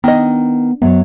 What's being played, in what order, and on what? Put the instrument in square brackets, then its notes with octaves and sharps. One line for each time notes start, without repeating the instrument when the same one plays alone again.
[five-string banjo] D#3 D#5 [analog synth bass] B3 [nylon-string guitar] D4
[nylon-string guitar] F#2 F#3 [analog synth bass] B3